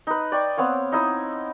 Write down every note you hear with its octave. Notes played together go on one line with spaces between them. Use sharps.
D#4 B4
D5 G5 C#6
B3 C4 C#5 F5
D#4 E4 D#5